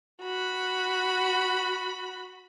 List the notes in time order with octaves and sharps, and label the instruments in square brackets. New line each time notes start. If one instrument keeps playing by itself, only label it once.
[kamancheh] F#4 B5